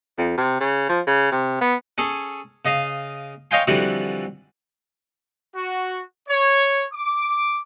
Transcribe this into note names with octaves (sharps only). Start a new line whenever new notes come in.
F2
C3
C#3
F3
C#3
C3
B3
C#4 G#4 A4
C#3 D#5 F5 D#6
C#5 D#5 F5 G5 G#5 C6
F2 D3 E3 G3 F#4
F#4
C#5
D6